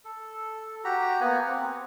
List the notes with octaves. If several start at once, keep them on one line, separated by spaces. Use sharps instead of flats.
A4
F#4 G4 A#5
A#3 B3 F#5 G#5
C4 F#5